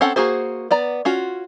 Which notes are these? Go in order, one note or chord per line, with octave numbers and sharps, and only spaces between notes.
C4 C#4 A4 F#5
A#3 F#4 G#4 C5
B3 D5 A#5
C#4 F4 F#4